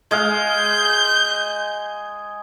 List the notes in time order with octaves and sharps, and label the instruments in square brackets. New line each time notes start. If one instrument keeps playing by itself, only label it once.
[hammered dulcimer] G#3 G#4 F5 [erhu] G6